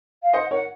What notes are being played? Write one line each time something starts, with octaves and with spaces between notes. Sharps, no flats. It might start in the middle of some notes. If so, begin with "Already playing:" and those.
F5
C5 D#5 F#5
A#4 C#5 F#5